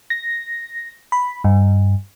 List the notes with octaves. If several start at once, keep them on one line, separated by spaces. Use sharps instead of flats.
A#6
B5
G2